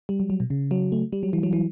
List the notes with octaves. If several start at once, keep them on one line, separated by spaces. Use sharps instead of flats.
G3
F#3
F#3
B2
C#3
F#3
A3
G3
F#3
E3
F#3
E3